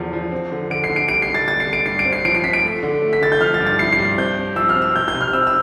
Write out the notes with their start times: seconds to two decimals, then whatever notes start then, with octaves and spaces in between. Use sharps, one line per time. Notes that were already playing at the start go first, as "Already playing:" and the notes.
Already playing: E2 D3 F3
0.13 F3
0.32 C4
0.51 D3
0.70 D3 D7
0.84 C7
0.89 D3
0.96 D7
1.08 G3 D7
1.22 C7
1.29 D3
1.34 A6
1.48 G3 A6
1.60 C7
1.67 D3
1.73 D7
1.86 G2 C7
1.99 D7
2.05 C4
2.13 C7
2.25 F3 D7
2.34 C7
2.44 C4 B6
2.53 D7
2.63 A3
2.83 D3
3.02 A3
3.13 B6
3.21 D3 A6
3.32 G6
3.41 F3 F6
3.54 A6
3.60 G2
3.67 A6
3.79 E4 C7
3.92 C7
3.99 G2
4.17 C4 G6
4.38 C4
4.56 F3 E6
4.69 F6
4.76 C4
4.82 E6
4.95 C3 G6
5.08 G6
5.15 C3
5.21 F6
5.33 C4 E6
5.47 E6